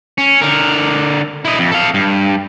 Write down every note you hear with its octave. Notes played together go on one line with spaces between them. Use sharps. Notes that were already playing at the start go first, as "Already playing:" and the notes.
C#4
D3 A#4
E4 D#5
F2
A4 F5
G2